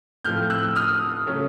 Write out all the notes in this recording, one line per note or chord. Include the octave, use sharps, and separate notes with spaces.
A2 F3 A3 C4 F6 G6
E6 F#6
D#6 F6
C#3 F#3 A3 C#4